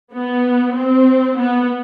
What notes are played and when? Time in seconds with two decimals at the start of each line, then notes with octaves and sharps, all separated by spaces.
0.14 B3
0.76 C4
1.37 B3